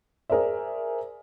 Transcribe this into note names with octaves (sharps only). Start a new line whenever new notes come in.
G#4 A#4 C5 D5 E5